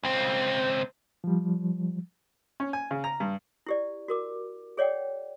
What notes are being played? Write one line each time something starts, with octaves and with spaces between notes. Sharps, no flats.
C#2 C4
F3 G3
C#4
G#5
C#3
A#5
G2
E4 G4 D5
F#4 A#4 D6
G#4 C#5 D5 F#5 G5